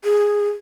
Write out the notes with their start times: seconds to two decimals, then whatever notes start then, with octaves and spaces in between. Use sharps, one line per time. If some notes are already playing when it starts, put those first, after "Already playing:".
0.04 G#4